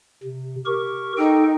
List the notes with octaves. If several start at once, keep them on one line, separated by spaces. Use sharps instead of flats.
C3
G4 A#4 C#6
D#4 A4 G5